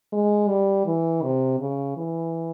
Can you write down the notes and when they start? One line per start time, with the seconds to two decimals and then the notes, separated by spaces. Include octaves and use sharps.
0.13 G#3
0.48 G3
0.86 E3
1.23 C3
1.59 C#3
1.97 E3